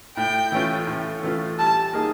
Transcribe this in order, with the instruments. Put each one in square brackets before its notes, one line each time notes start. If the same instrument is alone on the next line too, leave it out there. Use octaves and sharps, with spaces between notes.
[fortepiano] A2 [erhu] G5
[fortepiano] E3 A3 C#4 F4
A2
E3 A3 C#4 F4
[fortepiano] G3 [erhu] A5
[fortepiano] A#3 D#4 G#4